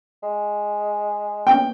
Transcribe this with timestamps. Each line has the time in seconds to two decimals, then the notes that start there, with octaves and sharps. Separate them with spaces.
0.23 G#3
1.47 A#3 B3 C#4 G5